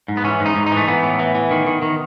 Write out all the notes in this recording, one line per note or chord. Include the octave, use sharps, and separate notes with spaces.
G#2
B3
E3 C#4
G#2
D#4
G#2
D#4
E3
A3
E3 B3
A2
E3
E3
D#3
D#3
D#3